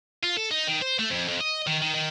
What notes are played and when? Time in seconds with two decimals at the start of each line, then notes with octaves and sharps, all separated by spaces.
0.23 F4
0.37 A4
0.51 D#4
0.68 D#3
0.82 C5
0.99 A3
1.11 F2
1.29 F2
1.41 D#5
1.67 D#3
1.82 D#3
1.94 D#3